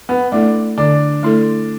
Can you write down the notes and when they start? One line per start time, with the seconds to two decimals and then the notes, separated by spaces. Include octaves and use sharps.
0.09 B3
0.32 A3 D4 E4 A4
0.78 D3 D4
1.23 A3 E4 A4